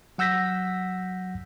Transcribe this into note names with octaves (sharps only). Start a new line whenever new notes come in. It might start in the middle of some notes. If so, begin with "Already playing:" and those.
F#3 F#5 E6 G6 A#6 B6